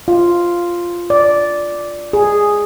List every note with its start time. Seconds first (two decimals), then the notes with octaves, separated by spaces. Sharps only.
0.08 F4
1.10 D5
2.13 G#4